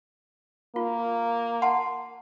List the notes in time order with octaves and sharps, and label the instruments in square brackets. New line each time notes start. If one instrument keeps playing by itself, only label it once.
[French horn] A#3 [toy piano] F4
[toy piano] F#5 A5 C6